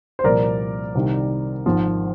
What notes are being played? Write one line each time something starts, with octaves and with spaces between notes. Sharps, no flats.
C5
C2 A#2 F3 A#4 D5
C2 C3 D#3
G#1 G#2 F3